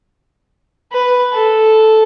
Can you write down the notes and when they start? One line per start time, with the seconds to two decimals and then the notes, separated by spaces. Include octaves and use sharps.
0.92 B4
1.33 A4